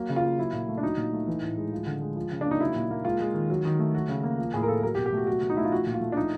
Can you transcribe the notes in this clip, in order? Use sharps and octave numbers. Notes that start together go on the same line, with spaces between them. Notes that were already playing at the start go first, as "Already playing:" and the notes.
Already playing: F#3 A#3
C#3
F4
A#3
F#3 E4
A#2
A3
D4
F#3 D#4
A#2
A3
E3
A2
G#3
F3
D3
G#3
F3
C#3
A#3 D4
D#4
F#3 E4
A#2
A#3
G#3 F4
G#3
D#3
F#3
D#3
A3
F#3 F#4
C#3
A#3
F3
A2 G#4
A#4
A#3 A4
F#3 A#4
G4
B2
G4
A3 F#4
F#3 F#4
B2
D#4
A3 E4
F4
F3 F#4
A#2
F4
A3
D4
F3 D#4